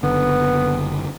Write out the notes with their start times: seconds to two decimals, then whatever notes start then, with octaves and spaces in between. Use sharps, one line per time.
0.03 F#1 D3 B3